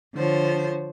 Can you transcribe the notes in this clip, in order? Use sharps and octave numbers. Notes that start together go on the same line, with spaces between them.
D3 F3 C5 C#5